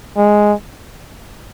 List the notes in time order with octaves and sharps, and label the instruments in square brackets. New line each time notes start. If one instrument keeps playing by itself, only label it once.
[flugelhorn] G#3